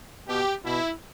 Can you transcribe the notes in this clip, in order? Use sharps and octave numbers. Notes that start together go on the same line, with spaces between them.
B2 G4
B2 E4